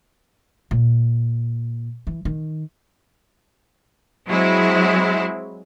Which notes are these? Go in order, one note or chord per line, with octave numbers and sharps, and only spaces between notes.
A#2
E3
D#3
F#3 G#3 C4 E4